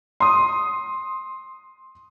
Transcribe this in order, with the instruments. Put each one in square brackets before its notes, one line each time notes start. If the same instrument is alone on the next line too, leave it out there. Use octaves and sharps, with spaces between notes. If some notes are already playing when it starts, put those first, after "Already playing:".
[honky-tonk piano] C6 D#6